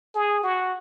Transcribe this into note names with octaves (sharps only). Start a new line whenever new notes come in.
G#4
F#4